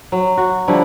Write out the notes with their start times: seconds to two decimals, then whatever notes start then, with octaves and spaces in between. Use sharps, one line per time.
0.12 F#3
0.37 F#4
0.68 D3 F3 G3 E4